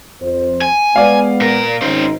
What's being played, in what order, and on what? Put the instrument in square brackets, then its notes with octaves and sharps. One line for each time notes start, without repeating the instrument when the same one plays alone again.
[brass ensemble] F2 C5
[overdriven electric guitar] G#5
[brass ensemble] G#3 B3 [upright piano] D5 F5
[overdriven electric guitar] A#2 A#4
[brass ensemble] G#1 D#4 [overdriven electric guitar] C#4 C5